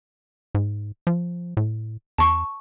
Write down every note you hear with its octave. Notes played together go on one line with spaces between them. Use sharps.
G#2
F3
A2
E2 A5 C#6